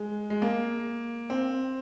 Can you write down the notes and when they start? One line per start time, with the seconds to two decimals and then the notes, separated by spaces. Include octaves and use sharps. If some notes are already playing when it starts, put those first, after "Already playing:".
Already playing: G#3
0.30 G#3
0.42 A#3
1.30 C4